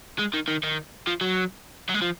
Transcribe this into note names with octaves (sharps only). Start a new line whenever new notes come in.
G#3
D#3
D#3
D#3
F3
F#3
F#3
G#3
F3